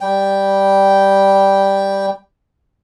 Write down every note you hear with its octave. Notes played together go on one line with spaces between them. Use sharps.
G3 G5